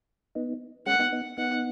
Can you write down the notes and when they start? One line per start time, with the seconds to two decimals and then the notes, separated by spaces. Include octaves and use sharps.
0.35 B3 D#4
0.86 G#3 C#4 F#5
0.99 B3 D#4
1.12 B3 D#4
1.38 B3 D#4 F#5